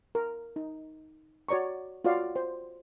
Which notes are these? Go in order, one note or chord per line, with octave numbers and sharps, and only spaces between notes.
A#4
D#4
F#4 C#5 D5 A#5 C#6
F4 F#4 C#5 D5 F5
C5